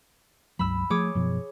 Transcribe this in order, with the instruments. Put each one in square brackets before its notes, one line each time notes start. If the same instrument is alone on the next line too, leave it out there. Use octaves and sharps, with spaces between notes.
[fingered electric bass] C#2 G2 F#3 [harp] B5 E6
[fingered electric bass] F3 A3 [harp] G#4 C#5 D6
[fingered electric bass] F#2 B2 F3